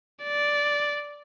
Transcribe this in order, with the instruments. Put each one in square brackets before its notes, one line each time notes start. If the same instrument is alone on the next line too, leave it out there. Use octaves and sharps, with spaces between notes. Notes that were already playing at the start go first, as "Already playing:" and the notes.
[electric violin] D5